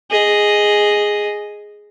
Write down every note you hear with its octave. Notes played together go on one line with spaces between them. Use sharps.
G#4 D#5